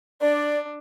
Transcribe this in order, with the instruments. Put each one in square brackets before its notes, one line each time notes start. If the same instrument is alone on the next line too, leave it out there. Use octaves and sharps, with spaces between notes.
[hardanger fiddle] D4 [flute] D5